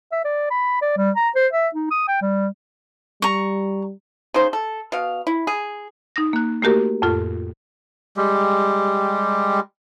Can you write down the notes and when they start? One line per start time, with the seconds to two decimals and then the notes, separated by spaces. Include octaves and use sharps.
0.12 E5
0.25 D5
0.51 B5
0.82 D5
0.97 G3
1.16 A#5
1.35 C5
1.53 E5
1.75 D#4
1.91 D#6
2.08 G5
2.22 G3
3.22 G3 A#5 C#6
4.34 C#3 D#4 C5
4.53 A4
4.92 B2 F5
5.27 E4
5.47 G#4
6.16 D#4 D#6 A#6
6.33 A#3 F#6
6.62 A3 A#3 F#4 G4 A#4
7.02 F2 A2 F4 A4
8.17 G3 G#3 G4